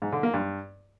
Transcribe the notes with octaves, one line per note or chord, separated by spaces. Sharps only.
G#2
D3
A#3
G2